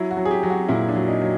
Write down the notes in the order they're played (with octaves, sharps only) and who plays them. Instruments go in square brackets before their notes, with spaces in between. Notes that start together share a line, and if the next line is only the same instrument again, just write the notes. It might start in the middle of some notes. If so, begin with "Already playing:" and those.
Already playing: [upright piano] F#3 E4
F#4
F#3
G#4
G4
F#3
F#4
A#2 E4
D4
F#3
D#4
F#3